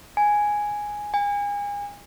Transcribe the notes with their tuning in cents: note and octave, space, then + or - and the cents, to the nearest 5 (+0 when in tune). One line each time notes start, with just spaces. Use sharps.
G#5 +0
G#5 -35